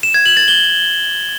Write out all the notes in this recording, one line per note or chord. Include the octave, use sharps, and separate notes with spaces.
E7
G#6
F#7
A6
G7